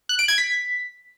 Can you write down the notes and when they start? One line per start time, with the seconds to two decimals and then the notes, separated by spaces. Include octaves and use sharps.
0.09 F#6
0.19 D7
0.28 G#6
0.38 B6